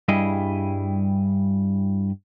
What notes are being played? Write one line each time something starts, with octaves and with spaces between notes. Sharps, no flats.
G2 G3 E4 G#4 D#5